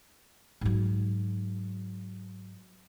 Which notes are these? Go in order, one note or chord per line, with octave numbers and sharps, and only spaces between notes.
G#2 F#3